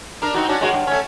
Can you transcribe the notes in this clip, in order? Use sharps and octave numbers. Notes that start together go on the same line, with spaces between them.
D4 A#4
C4 D#4 F#4
C#4 D4 F#4
G#3 A#3 F#4
G2
A3 C#4